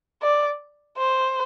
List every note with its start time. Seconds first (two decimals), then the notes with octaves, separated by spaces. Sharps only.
0.22 D5
0.97 C5